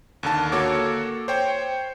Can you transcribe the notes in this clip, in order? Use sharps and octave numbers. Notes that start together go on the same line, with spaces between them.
D#2 D3 A5
A#3 F#4 A4 C#5 D6
C5 C#5 G5